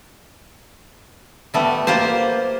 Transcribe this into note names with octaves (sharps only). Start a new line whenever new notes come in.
G3 A3 B3
A#3 F4 G4 C5